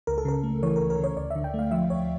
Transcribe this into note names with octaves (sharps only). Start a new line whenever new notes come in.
C#2 A#4
A4
C#3 A#4
A3
E3 C#5
C#2 A#4
A#4
C#3
C#5
D2 D5
E5
D3
G5
A3 F5
F3 E5
D2 C#5